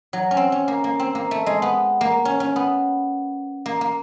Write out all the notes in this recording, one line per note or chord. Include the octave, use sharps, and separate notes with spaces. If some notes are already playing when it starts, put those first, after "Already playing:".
F#3
C#4
C4
C#4
A#3
A#3
C4
A#3
A3
G#3
B3
A#3
C#4
C#4
B3
A#3
A#3